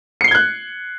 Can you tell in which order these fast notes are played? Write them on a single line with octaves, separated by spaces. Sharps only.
C#7 C7 G7 G#6 F#6